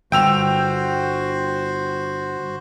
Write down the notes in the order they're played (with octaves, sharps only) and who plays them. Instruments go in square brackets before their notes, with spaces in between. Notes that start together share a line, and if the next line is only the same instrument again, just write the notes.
[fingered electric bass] G1 [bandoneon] F#4 C5 [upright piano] G5 E6 F7